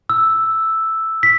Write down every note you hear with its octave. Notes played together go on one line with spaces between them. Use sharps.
E6
B6